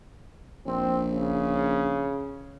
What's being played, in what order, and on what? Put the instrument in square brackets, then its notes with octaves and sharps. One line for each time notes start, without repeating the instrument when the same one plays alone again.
[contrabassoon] A#1 [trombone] C4
[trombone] C#3